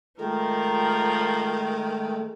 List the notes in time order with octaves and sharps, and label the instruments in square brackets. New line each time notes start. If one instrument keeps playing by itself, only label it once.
[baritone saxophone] D#3 [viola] F3 A#4 [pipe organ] G#3 A3